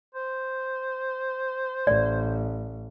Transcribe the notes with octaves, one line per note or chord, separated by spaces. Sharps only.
C5
A1 D5